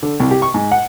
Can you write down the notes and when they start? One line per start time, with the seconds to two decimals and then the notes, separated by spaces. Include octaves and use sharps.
0.03 D3
0.20 C2
0.31 G4
0.42 C#6
0.54 G#2
0.72 F#5